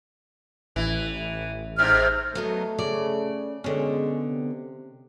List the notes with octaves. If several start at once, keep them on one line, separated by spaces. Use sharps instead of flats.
A1 E3
G#2 C3 F6
F#3 A3 B3 D#4
C#3 D5
B2 D3 G#3 C#4
C3